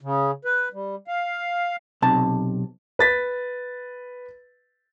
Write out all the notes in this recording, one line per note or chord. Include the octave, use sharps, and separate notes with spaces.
C#3
B4
G3
F5
B1 C3 A5
B4 A6 B6